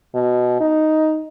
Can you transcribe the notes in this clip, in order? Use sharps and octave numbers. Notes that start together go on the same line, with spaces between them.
B2
D#4